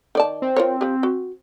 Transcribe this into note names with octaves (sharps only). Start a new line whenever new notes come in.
D#3 D5 A5
C4
F4 A#4 C#5
F3 G4
F#4